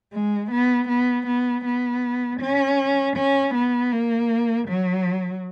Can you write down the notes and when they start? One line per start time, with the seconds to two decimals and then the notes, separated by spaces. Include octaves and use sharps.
0.13 G#3
0.51 B3
0.88 B3
1.27 B3
1.65 B3
2.40 C#4
3.16 C#4
3.54 B3
3.92 A#3
4.68 F#3